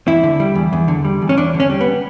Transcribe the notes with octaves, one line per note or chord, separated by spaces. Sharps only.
E2 E4
D3
G3
E2
E2
D3
G3
E2
C#4
E2 D4
D3
C#4
G3
B3